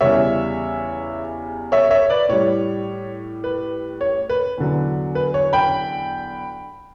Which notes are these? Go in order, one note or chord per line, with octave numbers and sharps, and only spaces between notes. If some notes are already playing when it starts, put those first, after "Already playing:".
E2 C#3 G3 C#5 E5
C#5 E5
C#5 E5
B4 D5
A2 G3 C#5
B4
C#5
B4
E2 D3 F#3
B4
C#5
G5 B5